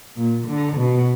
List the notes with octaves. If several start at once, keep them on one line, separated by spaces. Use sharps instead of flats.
A#2
D3
B2